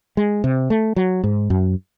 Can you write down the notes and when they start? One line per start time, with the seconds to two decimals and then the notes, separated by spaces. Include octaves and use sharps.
0.17 G#3
0.44 C3
0.70 A3
0.96 F#3
1.24 G#2
1.50 F#2